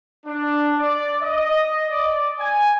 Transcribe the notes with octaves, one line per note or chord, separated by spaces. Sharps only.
D4
D5
D#5
D5
G#5